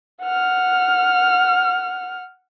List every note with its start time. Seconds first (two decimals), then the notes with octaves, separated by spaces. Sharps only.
0.23 F#5 F6